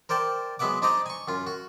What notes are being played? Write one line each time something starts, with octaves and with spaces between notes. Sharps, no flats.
A#4 C5 D5 G5 A5
F#3 G#3 B3 E5 F#5 D6
D4 D#4 C5 D5 D#5 A#5
G#5 C#6
F#2 F4
F#4